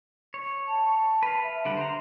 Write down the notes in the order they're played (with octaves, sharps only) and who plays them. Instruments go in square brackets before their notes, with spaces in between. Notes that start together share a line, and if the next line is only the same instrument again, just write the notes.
[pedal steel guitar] C#5
[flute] A5
[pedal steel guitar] B4 F5
[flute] E5
[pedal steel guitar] D3 G3 F#5
C5 A#5